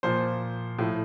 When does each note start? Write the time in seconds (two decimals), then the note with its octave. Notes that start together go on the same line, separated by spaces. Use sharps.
0.03 A#2 F3 C5
0.78 A2 F3